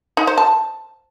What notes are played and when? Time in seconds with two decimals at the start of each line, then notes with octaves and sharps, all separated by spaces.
0.17 D#4
0.27 C5
0.38 A5